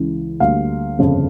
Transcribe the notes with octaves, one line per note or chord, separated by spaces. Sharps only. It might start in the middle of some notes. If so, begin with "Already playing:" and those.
Already playing: C#2 C#3 E3
D2 D3 G3 A#3 F5
G1 F2 C#3